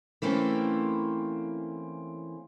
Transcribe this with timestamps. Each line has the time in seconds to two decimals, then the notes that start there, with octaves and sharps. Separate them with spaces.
0.22 E3 A3 A#3 C4 C#4